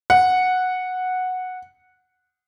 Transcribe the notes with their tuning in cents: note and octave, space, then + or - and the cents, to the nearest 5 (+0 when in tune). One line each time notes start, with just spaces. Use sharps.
F#5 -5